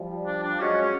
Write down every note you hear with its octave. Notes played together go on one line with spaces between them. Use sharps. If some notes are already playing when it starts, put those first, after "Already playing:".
Already playing: F3 G3
D4
D4
F#3 G#3 C#4
C#4